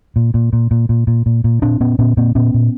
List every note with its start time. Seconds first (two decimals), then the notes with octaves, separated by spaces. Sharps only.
0.16 A#2
0.34 A#2
0.53 A#2
0.71 A#2
0.89 A#2
1.07 A#2
1.26 A#2
1.44 A#2
1.62 A#2 C4 D4
1.80 A#2 B3 C#4
1.99 A#2 B3 C#4
2.17 A#2 A#3 C4
2.35 A#2 B3 C#4
2.54 A#2